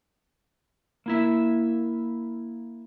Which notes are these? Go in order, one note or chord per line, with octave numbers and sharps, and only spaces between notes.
A#3 E4 E5